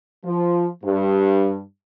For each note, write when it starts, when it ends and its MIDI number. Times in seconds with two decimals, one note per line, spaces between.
0.25 0.66 53
0.84 1.59 43